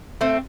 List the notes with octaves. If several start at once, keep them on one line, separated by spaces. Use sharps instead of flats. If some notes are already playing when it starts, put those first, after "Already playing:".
A3 C4